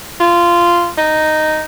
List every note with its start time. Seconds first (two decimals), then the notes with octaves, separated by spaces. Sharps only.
0.20 F4
0.98 D#4